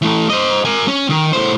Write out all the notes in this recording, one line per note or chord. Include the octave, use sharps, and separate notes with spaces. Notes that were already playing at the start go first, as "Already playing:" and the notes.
E3 A3
C5 D#5
A#4 G#5
C#4
D#3
A2 C5